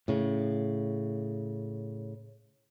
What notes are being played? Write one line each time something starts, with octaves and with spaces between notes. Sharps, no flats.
A2 C#3